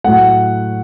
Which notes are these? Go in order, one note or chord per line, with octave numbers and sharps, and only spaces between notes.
A2 F#3 A3 F#5